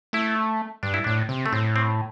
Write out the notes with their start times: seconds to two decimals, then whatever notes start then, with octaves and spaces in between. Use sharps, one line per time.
0.13 A3 E4
0.83 G2 D4
0.94 E4
1.04 A2 D4
1.29 C3
1.46 A3
1.52 A2 C4
1.76 C4